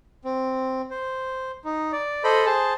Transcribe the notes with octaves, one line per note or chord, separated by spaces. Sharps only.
C4
C5
D#4
D5
A4 C5 D#5 B5
G#4 C5 A5